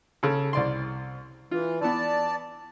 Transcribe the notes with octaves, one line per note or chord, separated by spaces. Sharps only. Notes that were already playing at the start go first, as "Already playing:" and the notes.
C#3 A4
C2 D5 C6
E3 F4
E3 B3 D5 A5